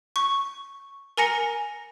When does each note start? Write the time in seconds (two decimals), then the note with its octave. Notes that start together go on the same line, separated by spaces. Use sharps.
0.16 C#6
1.17 A#4 G#5 A#5 A#6 C#7